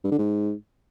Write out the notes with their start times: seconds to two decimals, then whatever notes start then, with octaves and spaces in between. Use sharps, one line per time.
0.04 G2
0.11 D3
0.18 G#2